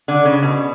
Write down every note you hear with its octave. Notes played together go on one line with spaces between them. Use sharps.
D3
C#3
B2